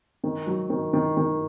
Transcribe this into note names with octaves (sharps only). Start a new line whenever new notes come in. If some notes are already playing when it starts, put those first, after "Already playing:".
D#3
F#3
D#3
D#3
D#3